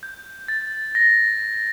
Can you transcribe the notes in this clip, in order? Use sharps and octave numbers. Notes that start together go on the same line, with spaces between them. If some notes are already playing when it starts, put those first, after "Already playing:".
G6
A6
A#6